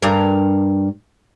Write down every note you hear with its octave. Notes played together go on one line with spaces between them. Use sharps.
G2 A#4